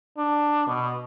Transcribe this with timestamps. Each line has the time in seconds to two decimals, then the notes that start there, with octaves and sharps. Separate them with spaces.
0.17 D4
0.67 B2